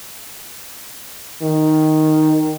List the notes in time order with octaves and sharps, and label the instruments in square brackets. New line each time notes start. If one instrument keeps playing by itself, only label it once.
[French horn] D#3